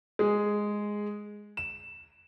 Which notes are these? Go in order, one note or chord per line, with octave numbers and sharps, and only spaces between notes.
G#3 G#4
E7